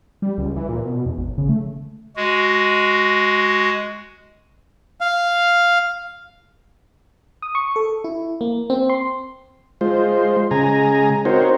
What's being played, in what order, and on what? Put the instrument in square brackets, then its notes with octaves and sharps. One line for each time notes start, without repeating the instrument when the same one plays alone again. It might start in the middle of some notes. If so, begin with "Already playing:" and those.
[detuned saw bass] G3
C#2
E3
A#2
B2
E2
G#1
C#3
A3
[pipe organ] G#3 F#4
[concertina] F5
[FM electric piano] D#6
C#6
A4
E4
A#3
C4
C6
[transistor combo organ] G#3 F4 C5
C#3 G#3 G#5 A#5
C4 D#4 F#4 A#4 C5 C#5